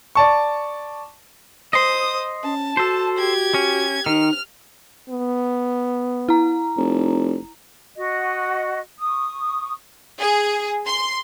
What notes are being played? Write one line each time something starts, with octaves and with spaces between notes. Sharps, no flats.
D5 A5 C#6
C5 D#5 C6 D#6
C#4 A5
F#4 A4 C5
G4 G#6
C#4
D#3 D#4 F6
B3
E4 A#5
F1
F#4 D#5
C#6 D#6
G#4
C6